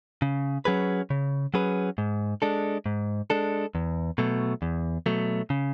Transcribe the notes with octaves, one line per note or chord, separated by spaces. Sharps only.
C#3
F#3 C#4 G#4 B4
C#3
F#3 C#4 G#4 B4
G#2
G#3 D4 A4
G#2
G#3 D4 A4
E2
B2 F#3 A3
E2
B2 F#3 A3
C#3